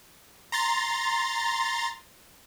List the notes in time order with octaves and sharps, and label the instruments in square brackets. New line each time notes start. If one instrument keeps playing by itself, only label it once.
[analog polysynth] A#5 C6 A6